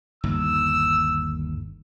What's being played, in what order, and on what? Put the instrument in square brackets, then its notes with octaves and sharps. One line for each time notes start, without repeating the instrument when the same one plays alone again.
[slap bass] G1 D#2 [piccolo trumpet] E6